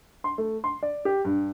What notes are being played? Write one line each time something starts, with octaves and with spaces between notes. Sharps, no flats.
C6
A3
C6
D5
G4
G2